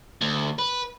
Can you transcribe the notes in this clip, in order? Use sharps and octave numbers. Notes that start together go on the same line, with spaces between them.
D2
B4